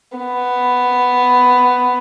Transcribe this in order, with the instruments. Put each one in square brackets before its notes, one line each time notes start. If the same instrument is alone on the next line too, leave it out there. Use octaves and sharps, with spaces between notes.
[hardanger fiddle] B3